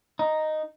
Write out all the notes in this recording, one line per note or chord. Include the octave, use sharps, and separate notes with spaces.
D#4